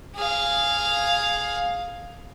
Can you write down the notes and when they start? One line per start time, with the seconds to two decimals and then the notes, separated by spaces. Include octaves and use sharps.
0.16 G#4 F5